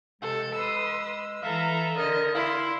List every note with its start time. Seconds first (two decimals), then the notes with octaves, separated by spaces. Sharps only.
0.22 C3 G#3 A4
0.54 B4 C6 D#6 E6
1.42 E3 A4 B4 E5 F5 A#5
1.97 D3 A#4 D#5
2.34 E4 F5 C6